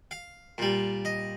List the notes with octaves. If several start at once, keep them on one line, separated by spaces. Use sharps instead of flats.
F5
A#2 G3
D#5